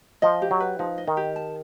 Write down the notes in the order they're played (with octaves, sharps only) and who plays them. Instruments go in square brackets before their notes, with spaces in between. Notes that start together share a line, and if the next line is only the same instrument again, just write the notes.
[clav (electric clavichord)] F3 [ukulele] D#5
[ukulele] G4
[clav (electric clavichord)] F#3
[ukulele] B4
[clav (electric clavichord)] F3 [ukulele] D#4
[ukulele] D#5
[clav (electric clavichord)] D#3
[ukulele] G4
A5